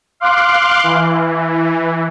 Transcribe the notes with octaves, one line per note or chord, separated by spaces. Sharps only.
F5 C6 D6 F#6
E3